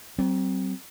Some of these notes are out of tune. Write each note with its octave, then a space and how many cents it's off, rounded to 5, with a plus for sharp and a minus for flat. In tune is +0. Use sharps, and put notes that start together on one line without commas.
F#3 +45 C4 +0